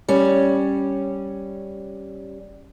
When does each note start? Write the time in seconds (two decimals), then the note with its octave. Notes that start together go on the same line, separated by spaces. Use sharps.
0.08 G3 C#4